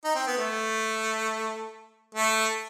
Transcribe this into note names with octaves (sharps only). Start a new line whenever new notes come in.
D#4
C4
B3
A3
A3